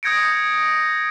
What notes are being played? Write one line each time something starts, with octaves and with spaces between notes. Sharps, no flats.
D#6 G6 G#6 A#6 C#7 D7